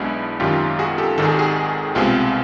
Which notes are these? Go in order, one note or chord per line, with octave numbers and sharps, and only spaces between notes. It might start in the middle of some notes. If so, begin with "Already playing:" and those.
Already playing: B1 B2 G#3 B3 D4 E4 F#4
G#1 F#2 D#3 F4 G4
F#4 G#4
G4 A4
G#1 G#2 D#3 A4
G#4
G4
F#4 G#4
C2 B2 G#3 C4 F4 G4